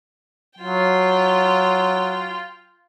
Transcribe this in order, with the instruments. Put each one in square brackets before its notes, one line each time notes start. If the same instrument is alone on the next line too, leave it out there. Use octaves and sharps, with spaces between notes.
[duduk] F#3 [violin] F4 G5